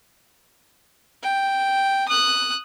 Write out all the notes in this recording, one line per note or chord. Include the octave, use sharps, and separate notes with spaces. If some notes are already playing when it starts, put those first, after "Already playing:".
G5
D#6 F#6